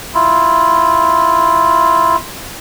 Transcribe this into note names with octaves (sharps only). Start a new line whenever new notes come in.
E4 F4